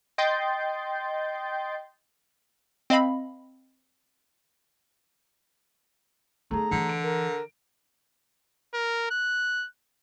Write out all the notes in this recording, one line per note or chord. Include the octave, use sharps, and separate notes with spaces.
D#5 G5 C6 G6 A6 C7
C4 D#5 F5 B5
A3 B3 D#4 G#4 A#5
D3 E3
D7
A#4
A#4
F#6